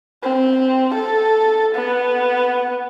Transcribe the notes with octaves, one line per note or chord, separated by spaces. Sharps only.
C4
A4
B3